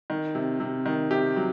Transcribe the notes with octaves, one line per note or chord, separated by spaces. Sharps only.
D#3
C3
C3
D#3
C3 G4
F#3